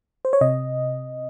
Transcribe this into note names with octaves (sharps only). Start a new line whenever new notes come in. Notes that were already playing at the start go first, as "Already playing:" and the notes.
C5
C#5
C3 D#5